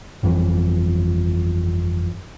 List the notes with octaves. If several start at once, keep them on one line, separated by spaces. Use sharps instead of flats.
G1 F2 E3